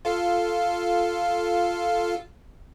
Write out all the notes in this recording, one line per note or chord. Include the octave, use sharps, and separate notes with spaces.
F4 A4 F5